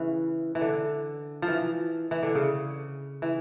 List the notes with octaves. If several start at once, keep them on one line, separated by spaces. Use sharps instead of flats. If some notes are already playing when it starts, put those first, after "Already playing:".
Already playing: C#3 E3
E3
D3
F3
E3
E3
D3
C#3
E3